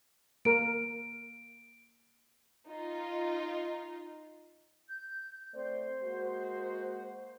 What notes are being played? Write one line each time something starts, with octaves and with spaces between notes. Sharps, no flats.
A#3 A#4 D7
D#4 F4
G6
A3 C4 C5 D5
G#3 A#3 F#4